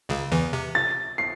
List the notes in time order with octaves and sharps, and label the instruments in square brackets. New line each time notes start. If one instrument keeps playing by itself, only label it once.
[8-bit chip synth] C#2 C#3
E2 E3
C3
[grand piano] A6
C7